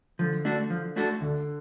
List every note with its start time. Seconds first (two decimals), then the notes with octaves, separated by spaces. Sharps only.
0.19 D3 F3
0.45 A3 D4 F#4 A4
0.70 F3
0.96 A3 D4 F#4 A4
1.21 D2 D3